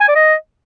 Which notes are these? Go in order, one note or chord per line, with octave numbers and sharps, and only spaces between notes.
G#5
D5
D#5